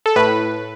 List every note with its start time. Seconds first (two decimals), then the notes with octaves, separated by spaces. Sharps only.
0.06 A4
0.16 A2 B4